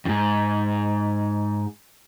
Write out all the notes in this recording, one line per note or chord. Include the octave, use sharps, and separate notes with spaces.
F2 G#2